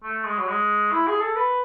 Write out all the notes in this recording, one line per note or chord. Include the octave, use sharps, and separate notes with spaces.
A3
G#3
F#3
G#3
E4
G#4
A4
B4